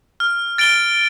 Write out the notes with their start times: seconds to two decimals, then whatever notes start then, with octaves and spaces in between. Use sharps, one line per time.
0.20 F6
0.58 A6 D7 G7